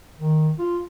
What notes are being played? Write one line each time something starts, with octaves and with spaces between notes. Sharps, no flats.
D#3
F4